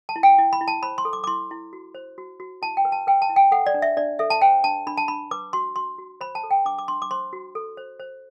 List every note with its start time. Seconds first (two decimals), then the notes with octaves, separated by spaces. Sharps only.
0.09 A5
0.16 E4
0.23 G5
0.39 E4
0.53 B5
0.61 E4
0.68 A5
0.83 C5 B5
0.98 C6
1.05 A4
1.13 D6
1.24 D6
1.27 E4 C6
1.51 E4
1.73 F#4
1.95 C5
2.18 F#4
2.40 F#4
2.62 E4 A5
2.77 G5
2.85 B4
2.92 A5
3.07 B4 G5
3.22 A5
3.29 E4
3.36 G5
3.52 A4 F#5
3.67 D5
3.74 D4
3.82 E5
3.97 D4 D5
4.19 A4 E5
4.30 A5
4.42 C5 G5
4.64 D4 A5
4.87 D4 B5
4.97 A5
5.08 D4 B5
5.31 B4 D6
5.53 F#4 C6
5.76 F#4 C6
5.98 F#4
6.21 C5 B5
6.35 A5
6.43 A4
6.51 G5
6.65 D4 D6
6.79 D6
6.88 D4 C6
7.02 D6
7.11 C5 C6
7.33 F#4
7.55 A4
7.77 C5
8.00 C5